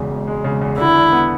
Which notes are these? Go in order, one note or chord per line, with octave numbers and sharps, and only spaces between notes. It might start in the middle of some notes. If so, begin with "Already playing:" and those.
Already playing: E1 E2 C#3 G#3
E1
G#3
C#3
E2
D3 E4
D4
B3